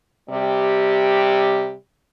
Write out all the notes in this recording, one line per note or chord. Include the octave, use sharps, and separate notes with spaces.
C3 G3 G4